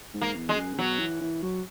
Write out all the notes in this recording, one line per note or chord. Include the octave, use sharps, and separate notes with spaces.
G#2
A#3
E2
G#3
F#2
C#3
B2 F#3
E3
E3
F#3